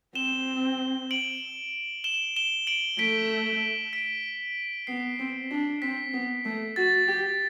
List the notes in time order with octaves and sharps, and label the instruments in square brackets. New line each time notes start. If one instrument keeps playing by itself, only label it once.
[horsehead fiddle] C4 [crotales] E7 G7
[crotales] D7 F#7
E7 G7
E7 G7
D7 F#7
[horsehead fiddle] A3 [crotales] B6 D7
[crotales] B6 D7
[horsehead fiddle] B3 [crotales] C7
[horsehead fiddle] C4
D4
[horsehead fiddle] C4 [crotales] B6
[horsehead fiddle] B3
A3
[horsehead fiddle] F#4 [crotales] A6
[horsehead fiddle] G4